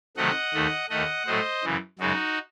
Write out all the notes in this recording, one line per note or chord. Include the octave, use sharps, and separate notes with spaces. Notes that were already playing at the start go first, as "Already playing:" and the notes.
C3 D#3 F#3 A3 D#5 F#5
D#2 D#3 A3
D#2 D#3 A3 D#5 F#5
A2 F#3 A3 C5 D#5
F#2 C#3 E3
F#2 C#3 G#3 D#4 F#4